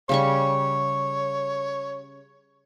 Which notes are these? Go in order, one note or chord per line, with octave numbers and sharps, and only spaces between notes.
C#3 G3 C#5 C#6